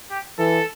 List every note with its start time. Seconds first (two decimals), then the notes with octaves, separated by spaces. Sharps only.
0.10 G4
0.39 E3 A4